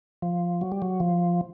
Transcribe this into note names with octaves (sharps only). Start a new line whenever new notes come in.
F3
F#3
G3
F#3
F3